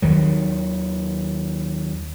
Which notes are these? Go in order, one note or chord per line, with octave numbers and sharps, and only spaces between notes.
D#2 D#3 F#3